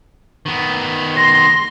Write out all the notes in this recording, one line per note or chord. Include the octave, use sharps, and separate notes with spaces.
D#3 B3
C6 A#6